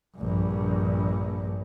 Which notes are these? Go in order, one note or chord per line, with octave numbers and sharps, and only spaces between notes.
A#1 G2